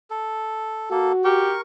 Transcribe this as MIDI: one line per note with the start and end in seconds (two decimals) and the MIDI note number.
0.10 0.89 69
0.91 1.12 58
0.91 1.52 66
0.91 1.12 69
1.25 1.58 67
1.25 1.61 70
1.25 1.61 85